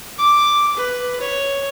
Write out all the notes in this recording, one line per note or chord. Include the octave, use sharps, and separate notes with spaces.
D6
B4
C#5